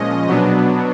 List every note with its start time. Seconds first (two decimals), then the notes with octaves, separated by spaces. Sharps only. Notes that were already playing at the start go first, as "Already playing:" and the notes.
Already playing: A#2 F3 G#3 C#4 D#5
0.28 B2 F#3 B3 D4